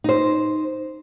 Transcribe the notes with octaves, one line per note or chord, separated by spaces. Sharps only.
D#4 C5